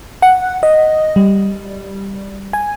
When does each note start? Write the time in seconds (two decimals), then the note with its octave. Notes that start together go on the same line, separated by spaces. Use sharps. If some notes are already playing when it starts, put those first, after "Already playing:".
0.22 F#5
0.63 D#5
1.16 G3
2.53 G#5